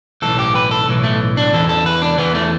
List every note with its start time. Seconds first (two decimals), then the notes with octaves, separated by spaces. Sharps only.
0.22 B1 A2 E3 A4
0.39 G4
0.55 B4
0.71 A4
0.88 B1 A2 E3
1.03 A3
1.37 D4
1.53 E2 E3 A4
1.69 A4
1.86 B4
2.02 D4
2.18 E2 E3 B3
2.35 A3